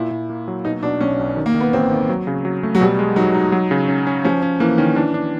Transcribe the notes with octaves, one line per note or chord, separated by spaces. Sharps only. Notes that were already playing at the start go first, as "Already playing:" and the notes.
Already playing: A#2 E4
A#2
A#3
F#3
B2 D#4
B2 D4
B1 C#4
B1
D#3
A#3
D#3
B3
A1 C4
D#3
F#3
C#3
F#3
A3
F#3
B2 G3
G#3
F#3 D#4
D#4
F#3
C#3
C#4
C#4
F3 C#4
C#4
E3 A#3
D#3 C#4
E3 D4
D4